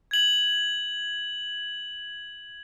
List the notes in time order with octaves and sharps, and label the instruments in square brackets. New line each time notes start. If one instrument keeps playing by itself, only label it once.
[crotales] G#6 F#7